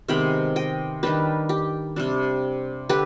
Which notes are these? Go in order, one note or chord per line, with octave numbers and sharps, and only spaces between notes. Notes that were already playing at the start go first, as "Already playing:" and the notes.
C3 D#3 G#3 B3 G5 B5
D#5 G5
D#3 G3 D4 G4 B4
G4
C3 G3 D4
D3 G4 B4